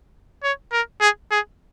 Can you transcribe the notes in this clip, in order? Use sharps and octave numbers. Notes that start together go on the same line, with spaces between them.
C#5
A#4
G#4
G#4